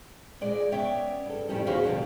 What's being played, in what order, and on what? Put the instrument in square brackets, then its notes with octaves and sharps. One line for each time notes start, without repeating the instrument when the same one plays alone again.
[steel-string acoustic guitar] A#2 G#3 D5
B3 C#4 C#5 D5 E5 G5
G2 A4
F2 A2 D#3 G3 C#4
E2 C#4 F#4 G#4 C5 F5
B2 D3 F3 G3